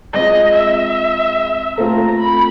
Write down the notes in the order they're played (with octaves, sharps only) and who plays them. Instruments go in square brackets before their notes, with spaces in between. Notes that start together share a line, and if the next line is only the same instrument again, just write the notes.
[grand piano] G#3 C4 F4 [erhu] D#5
[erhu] E5
[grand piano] A3 C4 F4 A4 [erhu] A#5
[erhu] B5